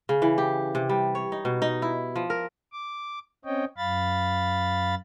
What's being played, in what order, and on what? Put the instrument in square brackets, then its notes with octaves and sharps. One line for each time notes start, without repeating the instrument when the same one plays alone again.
[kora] C#3
E3
G4
C3
G3
C#5
D#4
B2
D#4
E4
F3
A#4
[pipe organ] D6
C4 C#4 C#5 D#5 G5
F#2 F5 B5 A6